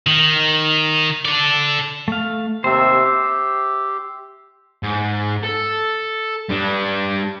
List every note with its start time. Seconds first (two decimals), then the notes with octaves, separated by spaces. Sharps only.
0.07 D#3
1.25 A4 D5
2.08 A3 F5
2.64 D#2 C3 C4 C5 E5
3.04 G4
4.83 G#2
5.44 A4
6.49 G3 D4